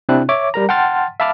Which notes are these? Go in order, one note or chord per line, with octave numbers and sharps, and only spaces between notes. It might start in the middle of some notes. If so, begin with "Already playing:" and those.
C3 C4 D4 E4 F#6
C#5 E5 D6
G3 A#4 A#5
F#5 G5 A5 C6 F6 A6
E5 F5 A5 B5 D6 F6